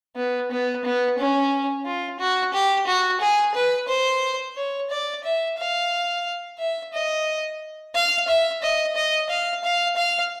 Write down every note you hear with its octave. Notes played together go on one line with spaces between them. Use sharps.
B3
B3
B3
C#4
F4
F#4
G4
F#4
G#4
B4
C5
C#5
D5
E5
F5
E5
D#5
F5
E5
D#5
D#5
F5
F5
F5